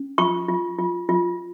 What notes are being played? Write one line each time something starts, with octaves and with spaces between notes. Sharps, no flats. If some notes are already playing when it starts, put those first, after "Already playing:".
Already playing: C#4
F4 C#6
F4
F4
F4